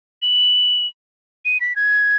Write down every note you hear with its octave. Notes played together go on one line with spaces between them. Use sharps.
F#7
D#7
B6
G#6